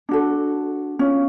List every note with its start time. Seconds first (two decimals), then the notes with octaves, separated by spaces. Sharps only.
0.09 D4 F#4 A4
0.99 C#4 F4